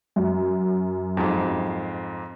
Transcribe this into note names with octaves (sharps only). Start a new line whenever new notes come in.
F#2
F2 G#2